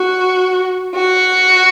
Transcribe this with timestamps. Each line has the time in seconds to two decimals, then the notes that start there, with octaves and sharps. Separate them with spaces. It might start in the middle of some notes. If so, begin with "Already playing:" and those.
Already playing: F#4
0.95 F#4